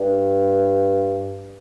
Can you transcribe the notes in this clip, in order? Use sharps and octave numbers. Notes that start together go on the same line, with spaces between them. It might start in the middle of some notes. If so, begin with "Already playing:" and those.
Already playing: G2